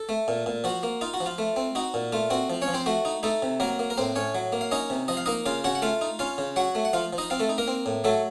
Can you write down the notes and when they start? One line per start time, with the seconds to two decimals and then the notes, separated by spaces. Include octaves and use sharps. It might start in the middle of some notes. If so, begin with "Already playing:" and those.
Already playing: A4
0.09 A3
0.28 A#2
0.46 A#2
0.64 F3 F#4
0.83 A#3
1.01 D#4 F4
1.14 F#4
1.20 F3
1.26 F4
1.38 A3
1.56 C4
1.75 D#4 F#4
1.94 A#2
2.12 A3 F4
2.30 C4 F#4
2.50 F3
2.62 C#4 C#5
2.68 F3
2.74 C4 C5
2.86 A3 F#4
3.05 D#4
3.23 A3 D#4 A4
3.42 C3
3.60 F#3 A#3 A#4
3.79 A#3
3.90 A#4
3.98 A2 C4 C5
4.16 A2 C#4 C#5
4.35 F#3
4.52 A#3
4.61 F5
4.71 C#4 D#4 D#5
4.90 C3
5.08 F3 D#5
5.17 F5
5.26 A#3 D#4 D#5
5.46 C#3 F4 F5
5.64 C#3 F#4 F#5
5.75 F#5
5.82 A3 F4 F5
6.01 D#4
6.19 C#4 F4 F5
6.38 C#3
6.56 F#3 F#4 F#5
6.75 A3
6.85 F#5
6.93 F3 F4 F5
7.13 F3
7.18 D#4 D#5
7.30 C4 F4 F5
7.40 A3 A4
7.49 D#4
7.58 A#3 A#4
7.67 C4
7.86 A2
8.04 F#3 A3 A4